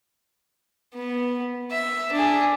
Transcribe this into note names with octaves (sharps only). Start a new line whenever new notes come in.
B3
E5
D4 G#4